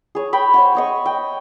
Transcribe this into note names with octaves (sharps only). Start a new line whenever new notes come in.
G#4 C#5
C#5 G5 B5
C5 C#5 F#5
C#5 D#5 C#6
G5